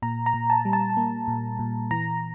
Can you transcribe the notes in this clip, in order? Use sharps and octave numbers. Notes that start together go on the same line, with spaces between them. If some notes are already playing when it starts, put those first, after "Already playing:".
A#2 A#5
A#5
A#2
A5
G3
A5
A#3
A#2
A#2
E3 A#5